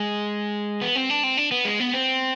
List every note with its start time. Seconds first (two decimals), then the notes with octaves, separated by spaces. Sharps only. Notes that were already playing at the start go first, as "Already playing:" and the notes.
Already playing: G#3
0.81 B3
0.96 C4
1.10 D4
1.24 C4
1.37 D4
1.51 B3
1.65 G#3
1.80 B3
1.94 C4